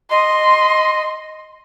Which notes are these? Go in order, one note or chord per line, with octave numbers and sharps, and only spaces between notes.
D#5 C6